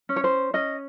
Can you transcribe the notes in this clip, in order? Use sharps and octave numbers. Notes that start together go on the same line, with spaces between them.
C#4
C#5
C5
C#4 D#5